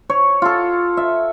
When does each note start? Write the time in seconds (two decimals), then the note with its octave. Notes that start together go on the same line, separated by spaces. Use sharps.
0.10 C#5
0.42 F4 A4
0.97 E5